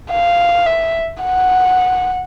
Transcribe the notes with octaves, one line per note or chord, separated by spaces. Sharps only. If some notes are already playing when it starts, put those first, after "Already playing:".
F5
E5
F#5